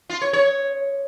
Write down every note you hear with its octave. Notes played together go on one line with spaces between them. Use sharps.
F4
C#5
C#5